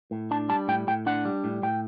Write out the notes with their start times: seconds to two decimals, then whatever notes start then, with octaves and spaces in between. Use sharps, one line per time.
0.11 A2
0.31 D4 A5
0.49 G3 A5
0.68 A2 G5
0.87 A2 G5
1.06 D4 F#5
1.25 G3
1.44 A2
1.63 A2 G5